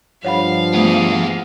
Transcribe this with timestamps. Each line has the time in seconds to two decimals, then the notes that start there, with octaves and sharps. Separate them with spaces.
0.24 G2 F3 C#5 F5 F#5 B5
0.74 A3 B3 G#4